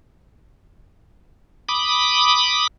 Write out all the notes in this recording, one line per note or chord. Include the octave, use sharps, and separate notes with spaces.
B5 D6 D#6